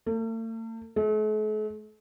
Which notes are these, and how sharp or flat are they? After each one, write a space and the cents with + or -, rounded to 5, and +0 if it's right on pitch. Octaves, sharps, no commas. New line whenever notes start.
A3 +45
A3 -45